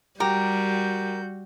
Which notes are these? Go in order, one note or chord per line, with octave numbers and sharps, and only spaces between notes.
G3 F#4 G4 A#4 G6